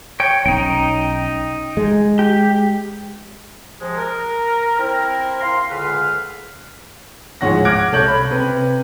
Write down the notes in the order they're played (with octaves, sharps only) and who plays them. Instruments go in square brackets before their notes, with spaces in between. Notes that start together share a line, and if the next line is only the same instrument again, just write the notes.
[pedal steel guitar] C#5 G5
[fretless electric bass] B1 C#4 [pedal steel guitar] D#4 G5
[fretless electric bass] G#3
[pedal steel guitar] G4
[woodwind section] C3 F3 G#3
A#4
C4 E4 A#4
F5 C6
C#2 D3 B4 F5 F6
[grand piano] D1 G#2 F3 C#5 F#5 A#6
D6 F6 F#6 G#6 A#6 D7
C2 A4 C#5 G6 F#7
B5
C3 B4